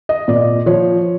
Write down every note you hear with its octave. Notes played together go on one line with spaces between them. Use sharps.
D#5
A#2 D5
F3 C#5